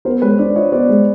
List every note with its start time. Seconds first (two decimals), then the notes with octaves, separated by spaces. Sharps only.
0.05 B3 A#4 C5
0.22 G#3 B4 C#5
0.39 D4 C5 D5
0.55 F4 C#5 D#5
0.72 B3 C5 D5
0.89 G#3